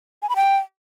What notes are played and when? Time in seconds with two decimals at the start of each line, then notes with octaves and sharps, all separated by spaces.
0.22 G#5
0.29 B5
0.36 G5